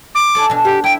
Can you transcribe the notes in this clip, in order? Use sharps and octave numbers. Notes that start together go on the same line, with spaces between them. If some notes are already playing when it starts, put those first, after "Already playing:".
D6
A4 D5 G#5
B2 D4
G4 C5
E4 E5 G5